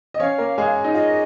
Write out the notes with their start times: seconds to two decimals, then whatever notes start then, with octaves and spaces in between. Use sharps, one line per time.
0.14 D#5
0.20 C#4 C#5 F5
0.38 A#3 A#4
0.58 G#3 G#4
0.84 D#4
0.94 F4 D#5